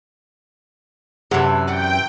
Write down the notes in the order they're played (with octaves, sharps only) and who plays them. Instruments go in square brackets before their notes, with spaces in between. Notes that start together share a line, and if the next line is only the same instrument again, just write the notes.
[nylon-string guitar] F#2 [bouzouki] C3 E3 [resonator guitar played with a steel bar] G4 C#5 A5
[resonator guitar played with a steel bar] B4 D5 F#5 [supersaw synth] G5